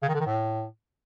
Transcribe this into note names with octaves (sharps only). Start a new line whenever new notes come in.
C#3
D#3
D3
D#3
A2